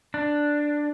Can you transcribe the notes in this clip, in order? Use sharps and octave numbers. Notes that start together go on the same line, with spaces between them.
D4